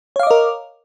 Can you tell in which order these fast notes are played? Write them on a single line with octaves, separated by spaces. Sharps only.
C#5 F5 D6 D#5 A#4